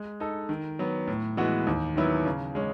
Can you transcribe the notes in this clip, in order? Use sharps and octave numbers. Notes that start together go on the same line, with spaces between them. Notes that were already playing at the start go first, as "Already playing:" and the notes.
Already playing: G#3
D#4 A4
D#3
F#3 B3
A2
E3 G#3 B3 F#4
D#2
D#3 F#3 B3 E4
C#3
G#3 C#4